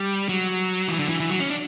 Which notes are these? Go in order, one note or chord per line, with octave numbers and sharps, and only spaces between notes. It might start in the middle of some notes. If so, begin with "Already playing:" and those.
Already playing: G3
F#3
E3
D3
E3
E3
F#3
C#4
D4